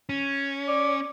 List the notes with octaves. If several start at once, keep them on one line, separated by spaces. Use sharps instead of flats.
C#4
D5